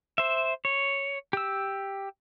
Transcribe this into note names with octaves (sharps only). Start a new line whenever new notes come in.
C5 E5
C#5
G4 E6